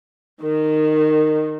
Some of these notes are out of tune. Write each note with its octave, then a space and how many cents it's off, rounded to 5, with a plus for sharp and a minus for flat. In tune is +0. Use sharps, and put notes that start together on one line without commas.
D#3 -15